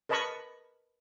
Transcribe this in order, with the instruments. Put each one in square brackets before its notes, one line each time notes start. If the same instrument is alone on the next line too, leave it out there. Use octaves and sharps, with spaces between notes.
[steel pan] A#4 B4 D#5 A5 B5 C#6